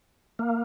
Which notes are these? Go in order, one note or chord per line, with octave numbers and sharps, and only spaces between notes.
A#3